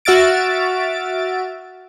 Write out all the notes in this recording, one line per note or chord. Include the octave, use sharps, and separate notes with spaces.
F#4 E5 F6 A6 D7